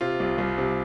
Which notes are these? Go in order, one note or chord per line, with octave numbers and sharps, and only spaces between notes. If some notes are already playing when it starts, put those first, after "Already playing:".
C3 F4
C2
C2
C3